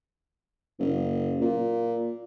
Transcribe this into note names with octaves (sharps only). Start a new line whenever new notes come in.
F#1
A#2